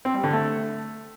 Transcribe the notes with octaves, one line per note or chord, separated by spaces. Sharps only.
C4
G3
D3
A3